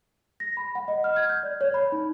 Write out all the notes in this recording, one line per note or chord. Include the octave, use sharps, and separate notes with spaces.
A#6
B5
F#5
D#5
F6
G#6
G6
D5
C#5
B5
D#4